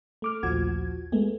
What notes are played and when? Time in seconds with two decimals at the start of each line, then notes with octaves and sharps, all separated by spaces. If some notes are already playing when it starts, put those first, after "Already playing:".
0.22 A3 D6 F6
0.43 A#1 D#2 F3 F#4 G#6
1.12 G#3 A3 B3